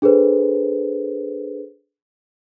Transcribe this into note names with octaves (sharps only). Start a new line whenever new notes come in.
D4 G#4 A4 B4 C5